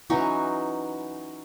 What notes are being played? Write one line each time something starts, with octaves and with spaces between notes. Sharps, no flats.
E3 F#3 C#4 D#4